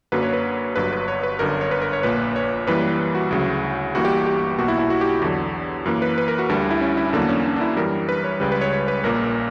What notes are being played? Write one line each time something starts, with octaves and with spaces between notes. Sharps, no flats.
F#2 D3 F#3 A#3 B4
C#5
B4
G1 G2 F#3 B4
B4
C#5
B4
G1 F#2 D3 A#4
C#5
B4
A#4
C#5
A#1 A#2 A#3 B4
C#5
F#2 E3 G3 A#3 B4
F#4
D2 C#3 F#3
G1 G2 E3 G3 A#3 F#4
G4
G4
B1 B2 A#3 F#4
E4
E4
F#4
G4
E2 D3 F#3
F#2 E3 A#3
B4
B4
A#4
F#4
D2 D3 G3 D4
D4
E4
C#4
E4
E2 D3 F#3 A#3 D4
C#4
D4
D4
E4
F#2 E3 G3 A#4
B4
C#5
C#2 C#3 G3 B4
B4
C#5
C#5
B4
A#1 A#2 A#3 A#4